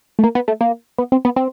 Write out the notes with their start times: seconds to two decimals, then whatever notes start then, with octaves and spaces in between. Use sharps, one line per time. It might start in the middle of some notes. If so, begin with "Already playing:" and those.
0.19 A3
0.24 A#3
0.35 B3
0.48 A3
0.61 A#3
0.99 B3
1.12 C4
1.25 B3
1.36 C4